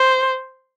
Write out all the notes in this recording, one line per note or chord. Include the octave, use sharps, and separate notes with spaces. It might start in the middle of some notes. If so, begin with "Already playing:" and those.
Already playing: C5